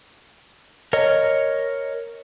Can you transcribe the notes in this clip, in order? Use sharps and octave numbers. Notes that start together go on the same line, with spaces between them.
A#4 C#5 D#5